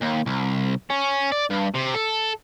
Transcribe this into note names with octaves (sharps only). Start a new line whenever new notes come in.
D#2
C2
C#4
D5
G2
C3
A4